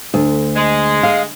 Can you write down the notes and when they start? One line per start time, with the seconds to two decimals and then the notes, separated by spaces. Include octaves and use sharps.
0.14 D2
0.56 G#3
1.03 F5